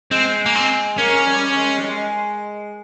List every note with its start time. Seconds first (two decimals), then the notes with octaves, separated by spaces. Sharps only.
0.11 G#3 C4
0.46 A#3
0.55 C4
0.98 A#3 C#4
1.27 G3
1.55 G#3
1.78 G3
1.84 G#3